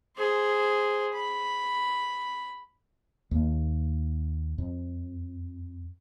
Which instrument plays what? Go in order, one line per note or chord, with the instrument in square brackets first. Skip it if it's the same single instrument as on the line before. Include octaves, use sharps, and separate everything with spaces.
[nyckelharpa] G#4 C5
B5
[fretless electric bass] D#2 A#3
F2